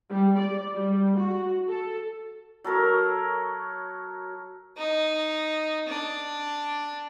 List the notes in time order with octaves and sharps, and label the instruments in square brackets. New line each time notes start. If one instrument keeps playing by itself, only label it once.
[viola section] G3
D5
G3
F#4
A4
[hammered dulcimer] F#3 A4 A#4 C#5
[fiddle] D#4
D4